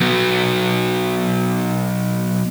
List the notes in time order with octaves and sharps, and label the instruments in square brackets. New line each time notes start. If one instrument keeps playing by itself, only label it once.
[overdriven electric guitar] F#3 B3